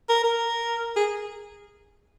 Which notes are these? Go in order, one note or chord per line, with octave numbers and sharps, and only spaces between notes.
A#4
A#4
G#4